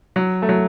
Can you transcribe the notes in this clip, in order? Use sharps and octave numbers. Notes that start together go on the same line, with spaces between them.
F#3
A3
F#3